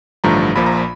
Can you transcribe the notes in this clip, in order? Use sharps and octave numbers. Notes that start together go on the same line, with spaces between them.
A1 G2 D3 F3 A3 A#5
A#1 A#2 F3 B5
A#5
B5